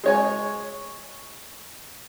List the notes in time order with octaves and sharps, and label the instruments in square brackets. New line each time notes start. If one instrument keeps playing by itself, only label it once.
[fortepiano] G#3 C#5 G#5